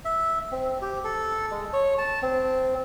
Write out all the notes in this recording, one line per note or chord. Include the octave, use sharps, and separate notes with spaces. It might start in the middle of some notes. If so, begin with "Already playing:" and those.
E5
C4
G4
A4
G#3
C#5
A5
C4